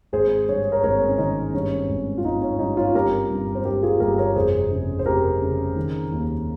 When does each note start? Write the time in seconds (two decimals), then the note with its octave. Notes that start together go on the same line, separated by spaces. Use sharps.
0.12 G#1 G#4 C5
0.48 G2 C#5
0.72 A#4 C#5
0.83 G#1 A#4 C#5
1.09 C#4
1.18 D#3 D#4
1.54 G2 C#4
1.89 G#1
2.18 F4
2.24 G#1 D#4
2.42 C#4
2.59 G2 D#4
2.77 C#4 F4
2.94 G1 G4 A#4
3.30 G2
3.55 C5
3.65 G2 G4 A#4
3.83 F4 G#4
4.00 G1 G4 A#4
4.18 A#4 C#5
4.36 F1 G#4 C5
4.71 C#3
4.99 C5
5.06 F1 G4 A#4
5.42 C#3
5.76 D#3
6.12 D#2